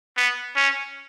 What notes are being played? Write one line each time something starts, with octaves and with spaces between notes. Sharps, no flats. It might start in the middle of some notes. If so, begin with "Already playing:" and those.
B3
C#4